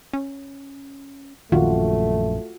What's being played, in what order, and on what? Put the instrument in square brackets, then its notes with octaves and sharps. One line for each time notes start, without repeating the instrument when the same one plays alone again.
[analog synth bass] C#4
[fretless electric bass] A#1 F#2 [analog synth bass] D#3 [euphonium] A3 [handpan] F4 F#4